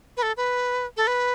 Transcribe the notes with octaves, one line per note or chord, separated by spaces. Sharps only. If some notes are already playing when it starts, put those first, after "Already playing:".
B4
A4
B4
A4
B4